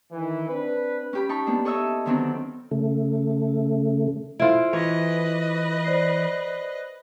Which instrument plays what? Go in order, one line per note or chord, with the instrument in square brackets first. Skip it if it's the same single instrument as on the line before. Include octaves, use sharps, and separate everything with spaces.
[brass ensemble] D#3 E3
C4 D4 B4
[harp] C#4 G4 B5
D#4 A5 B5 C#6
A#3 B3 D4
A4 C#5 D#5 E5 E6
D3 D#3 F#3 B3 C4 D4
[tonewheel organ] C#3 A3
[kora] E4 F4 [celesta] A4 C5 D7
[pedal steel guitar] E3 [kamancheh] B4 D#5 [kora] C#5
[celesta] C5 D5 C7